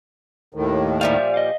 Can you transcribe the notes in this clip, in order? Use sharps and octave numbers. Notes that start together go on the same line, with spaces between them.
D#2 A2 D#3
A#2 F3 G3 E5 F5
D#5 F5